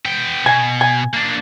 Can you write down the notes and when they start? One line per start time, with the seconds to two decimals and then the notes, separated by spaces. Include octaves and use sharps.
0.06 B3 G5
0.46 B2 G#5
0.81 G#5
1.13 A#3 D4